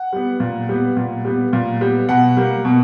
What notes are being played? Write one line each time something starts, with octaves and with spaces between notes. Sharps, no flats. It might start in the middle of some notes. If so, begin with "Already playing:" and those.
Already playing: F#5
G3 B3
A#2
G3 B3
A#2
G3 B3
A#2
G3 B3
B2 F#5
G3 A#3
B2